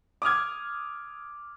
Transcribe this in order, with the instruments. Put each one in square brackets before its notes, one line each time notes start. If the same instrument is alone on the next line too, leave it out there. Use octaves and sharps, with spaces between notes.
[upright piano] D6 D#6 F6 G#6